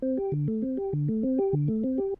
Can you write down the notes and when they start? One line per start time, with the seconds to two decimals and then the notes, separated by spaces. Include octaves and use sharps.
0.02 C4
0.17 G4
0.32 D3
0.48 A3
0.62 C4
0.77 G4
0.93 D3
1.08 A3
1.23 C4
1.38 G4
1.53 D3
1.68 A3
1.84 C4
1.98 G4